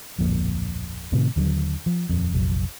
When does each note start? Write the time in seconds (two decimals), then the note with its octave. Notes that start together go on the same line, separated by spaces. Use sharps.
0.18 D1 A#1 F2 A#2
1.12 A2 C3 D#3
1.36 D#2 D3 D#3 F#3
1.86 F3
2.09 D#1 F2
2.34 F1 A#1 F#3